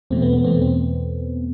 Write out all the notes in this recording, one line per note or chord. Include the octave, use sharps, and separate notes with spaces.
E2 B2 A3 C4
B3
B3
E2 B2 A3 C4
C4